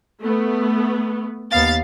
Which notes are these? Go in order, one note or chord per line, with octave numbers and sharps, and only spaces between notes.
A3 B3
D#2 B3 F5 A6